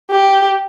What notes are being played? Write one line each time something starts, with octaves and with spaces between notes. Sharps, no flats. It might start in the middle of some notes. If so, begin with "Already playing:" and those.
G4